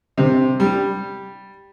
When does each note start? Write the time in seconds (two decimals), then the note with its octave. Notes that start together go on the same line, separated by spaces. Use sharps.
0.18 C3
0.60 G3